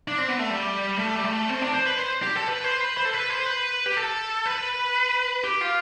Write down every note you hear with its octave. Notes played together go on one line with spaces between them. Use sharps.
D4
C4
B3
A3
G3
A3
G3
A3
C4
D4
C5
B4
C5
G4
A4
B4
C5
B4
C5
A4
B4
C5
B4
G4
A4
B4
G4
F4